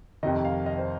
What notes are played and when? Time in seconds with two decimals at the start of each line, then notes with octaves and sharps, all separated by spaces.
0.23 F2 C3 D#3 D#5
0.45 F5
0.66 D#5
0.78 C5